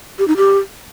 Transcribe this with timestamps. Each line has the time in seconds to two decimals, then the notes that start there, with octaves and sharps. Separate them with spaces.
0.19 G4
0.28 D#4
0.37 G4